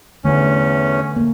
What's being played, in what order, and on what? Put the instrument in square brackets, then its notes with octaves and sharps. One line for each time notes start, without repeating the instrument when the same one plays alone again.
[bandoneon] E2 C#4 [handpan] D3 A3
[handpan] A#3